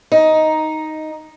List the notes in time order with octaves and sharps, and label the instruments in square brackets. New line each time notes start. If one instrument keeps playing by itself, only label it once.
[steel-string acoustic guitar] D#4